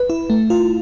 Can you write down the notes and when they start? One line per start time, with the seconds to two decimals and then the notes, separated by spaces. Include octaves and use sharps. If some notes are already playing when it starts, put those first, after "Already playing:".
Already playing: B4
0.10 E4
0.30 A3
0.50 F4